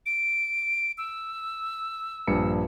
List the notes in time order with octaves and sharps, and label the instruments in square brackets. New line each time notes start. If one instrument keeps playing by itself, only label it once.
[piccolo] D7
E6
[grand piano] A#1 G2 C#7